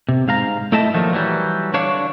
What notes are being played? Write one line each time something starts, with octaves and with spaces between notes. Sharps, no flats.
C3
G#2 F5 A#5
A3 E4 A4 D#5 E5 A5
A#2 D#3 F3 F#3 A3
E3 F#3 G3
D3 D4 C#5 F5